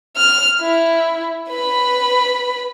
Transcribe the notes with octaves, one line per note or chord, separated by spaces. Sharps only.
F6
E4
B4 B5